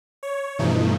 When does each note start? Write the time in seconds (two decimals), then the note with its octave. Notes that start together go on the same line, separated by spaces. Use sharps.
0.23 C#5
0.59 G2 B2 E3 F3 A3 D#4